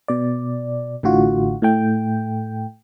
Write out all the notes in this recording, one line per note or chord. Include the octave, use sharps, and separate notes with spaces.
B2 D5
A1 A2 D3 F4 F#4
A2 A3 G5